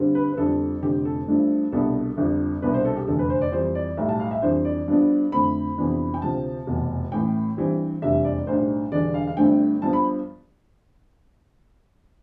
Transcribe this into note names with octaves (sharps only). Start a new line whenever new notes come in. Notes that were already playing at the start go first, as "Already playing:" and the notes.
Already playing: G2 D3 G3 C4
B4
B4
G1 F2 D3 G3 A4
F1 F2 D3 G4
A4
G2 F3 A3 D4
C2 B2 G3 B3 D4 A4
G1 F2 D3 G3
C2 B2 B3 D4 B4
C5
A4
G4
F1 E2 D3 A4
B4
C5
D5
F2 E3 G3 C5
D5
B1 A2 G3 E5
A5
F5
E5
F2 E3 G3 D4 C5
D5
G2 F3 B3 D4
F2 D3 A3 C4 B5
F2 C3 E3 B3 D4
G5
D2 C3 F3 A5
F1 E2 B2
A1 A2 E3 G5
G2 E3 G3 C4
F1 E2 C3 G3 D4 E5
D5
B1 A2 G3 D4 C5
E1 E2 D3 G3 D4 D5
F5
F5
G1 G2 D3 A3 C4 G5
G2 F3 B3 A5
B5